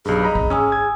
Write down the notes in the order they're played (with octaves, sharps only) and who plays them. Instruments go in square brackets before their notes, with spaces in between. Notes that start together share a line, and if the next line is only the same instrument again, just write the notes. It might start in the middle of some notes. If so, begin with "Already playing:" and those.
[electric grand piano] B1 G2 [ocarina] G#4
[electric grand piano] D#5 A#5 B5
[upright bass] A#1 A#3
[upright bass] G#1 [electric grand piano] C#4 [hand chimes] G#5 D#6 E6
[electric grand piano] G#6